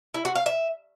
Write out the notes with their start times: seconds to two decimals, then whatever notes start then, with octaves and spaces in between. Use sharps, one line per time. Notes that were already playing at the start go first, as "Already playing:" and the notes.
0.14 E4
0.25 F#4
0.35 F5
0.46 E5